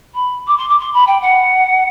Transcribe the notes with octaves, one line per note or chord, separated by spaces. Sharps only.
B5
D6
C6
D6
C6
B5
G5
F#5